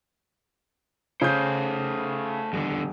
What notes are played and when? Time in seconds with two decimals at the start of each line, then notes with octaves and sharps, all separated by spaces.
1.21 C#3 A3 C5 G6
2.53 D#1 E2 D3